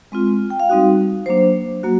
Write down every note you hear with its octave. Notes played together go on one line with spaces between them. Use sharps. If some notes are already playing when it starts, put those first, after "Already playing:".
G#3 C4 F4
G5
F5
G3 C4 D#4 F#4
F#3 A#3 D4 C5
F#3 A#3 F#4